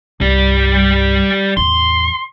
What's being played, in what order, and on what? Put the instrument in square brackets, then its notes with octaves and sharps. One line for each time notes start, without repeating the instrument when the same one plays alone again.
[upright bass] C2 G2 [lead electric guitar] G3 G4
[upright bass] A1 E2 [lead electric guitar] C6